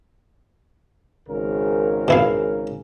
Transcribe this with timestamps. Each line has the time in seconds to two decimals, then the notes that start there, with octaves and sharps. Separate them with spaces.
1.27 G#1 C#3 A#4
2.08 B2 E4 F5